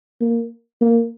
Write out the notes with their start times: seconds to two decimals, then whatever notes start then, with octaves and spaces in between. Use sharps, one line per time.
0.21 A#3
0.81 A#3